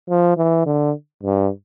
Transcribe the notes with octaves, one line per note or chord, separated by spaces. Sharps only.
F3
E3
D3
G2